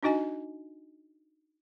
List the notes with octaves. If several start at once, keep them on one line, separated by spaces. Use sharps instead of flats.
D4 D#4 F#4 D#5 G#5